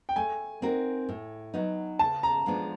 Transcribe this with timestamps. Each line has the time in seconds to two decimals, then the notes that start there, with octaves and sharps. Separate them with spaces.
0.09 G5
0.16 A3 G#5
0.62 C4 D#4 F#4 A#4
1.09 A2
1.54 F#3 B3 D#4
1.99 C#3 A5
2.23 A#5
2.46 F3 G#3 B3 D4